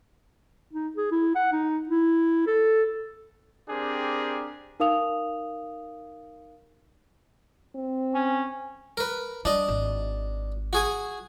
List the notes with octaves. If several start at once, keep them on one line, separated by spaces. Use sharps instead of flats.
D#4
G#4
E4
F#5
D#4
E4
A4
C4 D4 G4 G#4 A#4
D#4 A#4 F5 D#6 F7
C4
C#4
A#4 B4
G3 D4 D#5
G#1
F#4 G#4 G#5